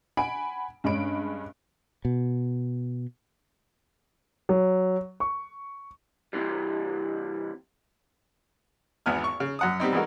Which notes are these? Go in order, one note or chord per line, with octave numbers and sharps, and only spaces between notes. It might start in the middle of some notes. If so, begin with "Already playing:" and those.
F#5 G#5 B5 D7
G2 G#3 C#4 D4 B5 D7
B2
F#3
C#6
C3 E3 G3
G#1 E2 B3 G#5 F6
C#6
C#3
F#2 F#5 D#6
G3 B3 C4 D#4
E3 G3 G#3 D#4 F#4 A#4